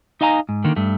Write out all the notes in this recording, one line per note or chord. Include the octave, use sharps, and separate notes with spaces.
D#4 D#5 F5 G#5 A#5
G#2
D3 D#3 A#3
G2 A3